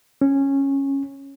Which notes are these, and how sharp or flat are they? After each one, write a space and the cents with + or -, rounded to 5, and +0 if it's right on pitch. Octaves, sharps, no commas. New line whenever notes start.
C#4 -10